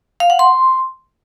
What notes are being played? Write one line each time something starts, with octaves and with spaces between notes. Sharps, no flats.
F5
F#5
C6